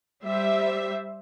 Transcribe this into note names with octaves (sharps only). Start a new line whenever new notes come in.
G3 C5 E5